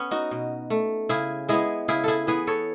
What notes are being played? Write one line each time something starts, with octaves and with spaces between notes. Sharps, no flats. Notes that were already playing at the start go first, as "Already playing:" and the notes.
Already playing: B3 C#4
D#4 F#4
B2
A3
C#3 E4 G#4
G#3 B3 E4 G#4
C#3 E4 G#4
E4 G#4 A4
E3 B3 G#4 B4
A4 C#5